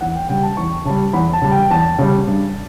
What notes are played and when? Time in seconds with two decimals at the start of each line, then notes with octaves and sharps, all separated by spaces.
0.01 E2 F#5
0.16 G5
0.29 C#3 G3 G5
0.43 A5
0.57 E2 C#6
0.85 C#3 G3 A5
1.13 E2 B5
1.33 A5
1.42 C#3 G3
1.51 G5
1.70 E2 A5
1.98 C#3 G3
2.27 G2